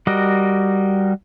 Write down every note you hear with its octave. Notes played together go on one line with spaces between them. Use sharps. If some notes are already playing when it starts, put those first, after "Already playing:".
G3 F#4 A#4 D#5